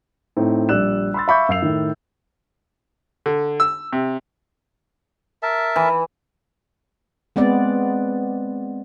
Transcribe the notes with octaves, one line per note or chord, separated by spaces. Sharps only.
A2 C4 D#4
A#1 G3 D5 E6 F#6 E7
B5 C6 E6 A6
E5 F5 B5 C#6 D6 G6
F#2 F5 E6 C7 F7
A2 D#3 E4
D3
E6
C3
A#4 E5 A5
E3
G#3 B3 C4 D5